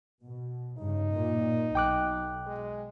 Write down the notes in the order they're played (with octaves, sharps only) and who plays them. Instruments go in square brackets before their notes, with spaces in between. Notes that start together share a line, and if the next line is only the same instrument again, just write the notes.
[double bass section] B2
[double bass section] G2 C#3 [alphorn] D#4
[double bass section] A#2
[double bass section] B1 [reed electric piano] G5 D6 F#6
[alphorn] G#3